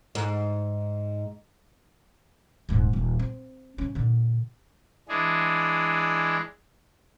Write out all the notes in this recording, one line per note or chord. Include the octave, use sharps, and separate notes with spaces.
G#2
D#1 G#2
D#1
C4
C3 C#4
A#2 D3
E3 G#3 D4 G#4